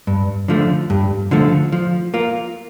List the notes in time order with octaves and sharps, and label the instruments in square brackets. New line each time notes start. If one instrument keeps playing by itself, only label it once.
[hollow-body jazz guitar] G2
D3 F3 A3
G2
D3 F3 A3
F3
A#3 F4